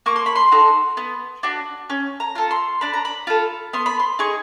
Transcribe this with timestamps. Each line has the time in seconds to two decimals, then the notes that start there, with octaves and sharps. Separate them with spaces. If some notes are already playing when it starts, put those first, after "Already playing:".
0.06 A#3 C#6
0.16 C6
0.26 B5
0.36 C6
0.51 D#4 F#4 A4
0.97 B3
1.43 D4 F#4
1.90 C#4
2.20 A#5
2.35 F4 A4
2.51 C6
2.81 D4 B5
2.94 A#5
3.05 B5
3.27 F4 A4
3.73 B3 C6
3.86 B5
4.00 C6
4.19 D#4 G#4 C#6